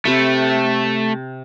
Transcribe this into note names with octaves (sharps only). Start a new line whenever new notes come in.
C3 A3 B5